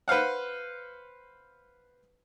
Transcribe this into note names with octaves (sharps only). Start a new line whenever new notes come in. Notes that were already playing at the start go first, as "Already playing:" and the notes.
B4 C5 F5 F#5